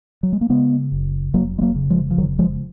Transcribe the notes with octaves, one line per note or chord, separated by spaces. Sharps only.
F#3
G#3
A#3
C#3 G#3 B3
F#1
F1 F#3 A#3
G#3
F#3 A#3
C#3
F3 G#3
F3
F1 D#3 F#3
F3 G#3